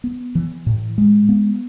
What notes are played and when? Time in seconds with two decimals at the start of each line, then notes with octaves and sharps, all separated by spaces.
0.04 B3
0.35 E3
0.66 A2
0.98 G#3
1.29 B3